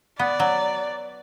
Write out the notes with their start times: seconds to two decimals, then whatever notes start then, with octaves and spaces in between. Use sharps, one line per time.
0.19 B3 D5
0.40 F#3